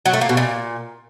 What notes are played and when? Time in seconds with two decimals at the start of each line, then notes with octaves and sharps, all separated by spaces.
0.06 F#3
0.13 A3
0.21 A#3
0.29 B2
0.37 A#2